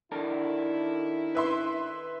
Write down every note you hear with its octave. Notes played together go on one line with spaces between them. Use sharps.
D#3 D4 E4 A4 A#4
B4 E5 C6